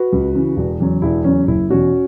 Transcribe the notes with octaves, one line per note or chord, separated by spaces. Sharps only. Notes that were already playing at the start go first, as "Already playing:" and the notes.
Already playing: F#4 B4
C#2
C#3 E3
E1
E2 C#3 F#3
E1 E4
E2 C#3 F#3 C#4
F#1 E4
E2 B2 C#4 F#4